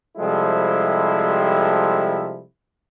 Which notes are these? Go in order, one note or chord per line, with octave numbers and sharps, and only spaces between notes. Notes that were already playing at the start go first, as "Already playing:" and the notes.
C3 F3 G3 G#3 E4 A4